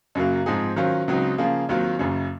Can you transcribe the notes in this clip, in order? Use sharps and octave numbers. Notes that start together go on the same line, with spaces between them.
F#2 C#3 F#3 A#3
G#2 F3 C4 D#4 G#4
D#3 F#3 C#4 F4 C5
C#2 C#3 F#3 C4 D#4
C#3 F3 A#3 F4 G#4
D#2 D#3 F#3 C4 F4
F#1 F#2 C#3